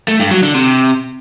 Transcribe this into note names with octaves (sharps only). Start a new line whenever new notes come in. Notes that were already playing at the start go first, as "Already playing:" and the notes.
A3
G2
F#3
D3
C3